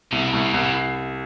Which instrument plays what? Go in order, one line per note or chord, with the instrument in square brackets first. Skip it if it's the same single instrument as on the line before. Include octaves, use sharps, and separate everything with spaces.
[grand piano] C2 [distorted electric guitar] C3
[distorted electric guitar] B2
[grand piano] C2 [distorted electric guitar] A2
[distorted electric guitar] B2
[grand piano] C2 [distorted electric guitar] B2
[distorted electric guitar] A2